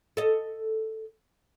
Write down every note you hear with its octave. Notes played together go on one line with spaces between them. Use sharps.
A4 D#5